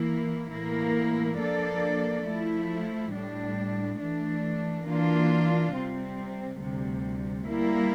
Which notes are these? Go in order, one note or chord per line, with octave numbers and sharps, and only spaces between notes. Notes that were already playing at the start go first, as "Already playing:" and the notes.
Already playing: E3 A#3 E4
A2 E3 A#3 E4 A#4
F3 A#3 D4 A4 D5
F3 A3 E4
A2 G3 D4
E3 A3 D4
E3 A#3 D4 F4
C3 G3 C4
D2 C3 G3
G3 A#3 E4